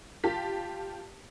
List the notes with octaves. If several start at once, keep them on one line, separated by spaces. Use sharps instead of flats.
F4 G4 A5 B6